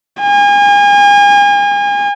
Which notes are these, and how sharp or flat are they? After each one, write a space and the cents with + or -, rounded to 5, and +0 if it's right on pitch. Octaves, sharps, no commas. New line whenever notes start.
G#5 -35